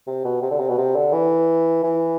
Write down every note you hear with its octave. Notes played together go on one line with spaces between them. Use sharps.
C3
B2
C3
D3
C3
B2
C3
D3
E3
E3